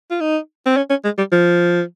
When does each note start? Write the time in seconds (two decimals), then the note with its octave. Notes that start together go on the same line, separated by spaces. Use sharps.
0.11 F4
0.21 D#4
0.66 C4
0.77 C#4
0.90 C#4
1.04 G#3
1.18 G3
1.32 F3